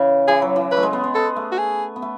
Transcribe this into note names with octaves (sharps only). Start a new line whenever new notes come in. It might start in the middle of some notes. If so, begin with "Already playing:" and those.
Already playing: C#3 E3
E3 G#4
F#3
E3
F#3 B4
A3
G#3
B3
B3
B3 A4
A3
F#4
G#4
B3
A3